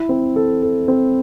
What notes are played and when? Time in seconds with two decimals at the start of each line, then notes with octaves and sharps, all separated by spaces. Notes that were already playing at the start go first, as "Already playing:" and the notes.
Already playing: E4
0.09 C4
0.36 A4
0.62 A4
0.88 C4